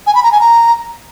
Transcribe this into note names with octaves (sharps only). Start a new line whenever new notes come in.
G#5
B5
A#5
G#5
A#5